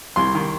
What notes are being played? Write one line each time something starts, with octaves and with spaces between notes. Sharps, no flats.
C2 C6
D#3